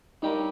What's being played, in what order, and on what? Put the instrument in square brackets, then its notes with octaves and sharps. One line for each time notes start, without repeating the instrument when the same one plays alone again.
[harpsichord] G2 G3 C#4 G4 A#4 [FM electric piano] D#4